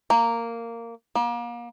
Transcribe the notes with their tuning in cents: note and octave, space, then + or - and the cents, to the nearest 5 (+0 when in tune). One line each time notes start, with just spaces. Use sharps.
A#3 -10
A#3 +35